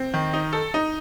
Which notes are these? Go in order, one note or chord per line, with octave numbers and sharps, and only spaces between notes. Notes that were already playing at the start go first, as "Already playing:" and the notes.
Already playing: C4
D#3
D#4
A4
D#4